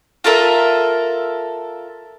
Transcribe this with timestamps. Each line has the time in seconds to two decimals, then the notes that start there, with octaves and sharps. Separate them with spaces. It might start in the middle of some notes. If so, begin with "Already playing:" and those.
0.24 F4 A4 A#4 E5